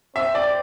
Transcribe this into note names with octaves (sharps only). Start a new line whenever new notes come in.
C4 E5
D5